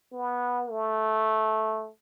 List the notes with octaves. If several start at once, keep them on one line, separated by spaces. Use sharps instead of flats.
B3
A3